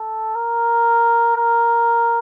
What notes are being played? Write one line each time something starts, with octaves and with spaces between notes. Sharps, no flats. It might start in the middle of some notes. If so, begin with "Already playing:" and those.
Already playing: A4
A#4
A#4